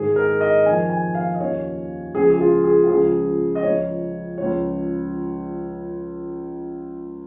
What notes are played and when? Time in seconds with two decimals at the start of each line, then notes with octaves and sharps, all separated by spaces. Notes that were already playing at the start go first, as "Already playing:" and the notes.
Already playing: G#2 D#3 G#4
0.16 A#4
0.41 D#5
0.65 F2 D#3 G#5
0.90 G#5
1.15 F5
1.34 D#5
1.40 D#2 C#3 F3 C#5
2.14 C#2 C#3 F3 G#4
2.30 G#4
2.40 F4
2.64 G#4
2.84 F4
2.89 C#2 C#3 F3 G#4
3.55 D#5
3.63 C#2 C#3 F3 C#5
4.38 C#2 C#3 F3 C#5